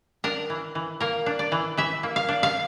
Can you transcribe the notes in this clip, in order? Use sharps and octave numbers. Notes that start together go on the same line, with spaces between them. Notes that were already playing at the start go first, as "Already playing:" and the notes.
D4 A#4
E3
E3
A#3 A#4
D4
D5
E3
E3 E5
A#3
F5
D4
F5